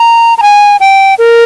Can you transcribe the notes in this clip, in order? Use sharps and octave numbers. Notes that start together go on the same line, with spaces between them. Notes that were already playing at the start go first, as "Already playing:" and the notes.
Already playing: A#5
A#5
G#5
G5
A#4